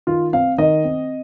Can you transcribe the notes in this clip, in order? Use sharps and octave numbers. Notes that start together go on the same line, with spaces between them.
D#3 F4
C4 F5
D#3 D#5
C4